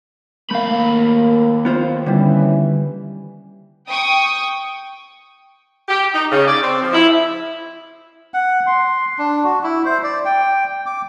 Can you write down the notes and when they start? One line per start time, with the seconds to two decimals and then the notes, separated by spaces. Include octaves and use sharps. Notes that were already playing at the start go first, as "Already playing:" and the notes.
0.51 D#2 A3 A#3 F5 B5
1.65 B3 F4 C5
2.06 D3 E3 G3 C#4
3.90 G5 C#6 D#6
5.88 G4
6.13 D#4
6.32 C#3
6.47 D5
6.63 C4
6.82 F3
6.93 E4
8.34 F#5
8.67 C6
9.18 D4
9.44 F#4
9.63 E4
9.85 C5
10.03 D5
10.25 G5
10.86 D6